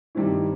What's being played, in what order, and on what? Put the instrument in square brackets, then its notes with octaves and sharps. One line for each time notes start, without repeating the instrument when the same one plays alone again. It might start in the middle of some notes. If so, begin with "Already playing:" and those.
[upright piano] G2 D#3 G3 C4 E4